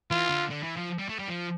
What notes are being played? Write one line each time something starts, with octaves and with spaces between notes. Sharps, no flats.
E3 F4
D3
D3
E3
F3
G3
A3
G3
F3